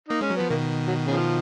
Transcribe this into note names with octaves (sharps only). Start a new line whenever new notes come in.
A#3 D#4
G#3 C#4
F#3
F3 B3
B2 D#3 A#3
F#3
C#3 F3